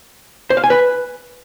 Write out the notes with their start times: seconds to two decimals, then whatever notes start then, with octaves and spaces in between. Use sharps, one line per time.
0.50 C5
0.57 F5
0.64 G#5
0.70 B4